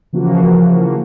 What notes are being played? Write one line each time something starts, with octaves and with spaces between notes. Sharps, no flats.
C#3 E3 F3 A#3 F#4